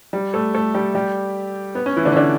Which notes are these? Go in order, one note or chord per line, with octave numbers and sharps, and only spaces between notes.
G3 G4
A3 A4
A3 A4
G3 G4
G3 G4
B3
C#4
E3 E4
D3 D4
C#4
D3 D4